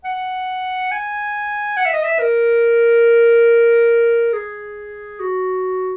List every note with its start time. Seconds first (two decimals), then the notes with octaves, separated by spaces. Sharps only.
0.04 F#5
0.91 G#5
1.76 F#5
1.85 E5
1.93 D#5
2.03 E5
2.19 A#4
4.33 G#4
5.20 F#4